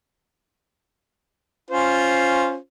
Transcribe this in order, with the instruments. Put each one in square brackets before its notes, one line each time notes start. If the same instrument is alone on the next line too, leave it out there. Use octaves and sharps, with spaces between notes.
[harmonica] C#4 F4 C5